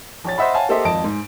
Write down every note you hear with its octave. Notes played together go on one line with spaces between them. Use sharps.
A#1 C#5 A6
C5 D#5 E5 F#5 B5
C#5 F5 F#5 G#5 A5
A#3 G4 A4 C5 D#5 E5
G#1 F2 D#5 A5 D7
G#2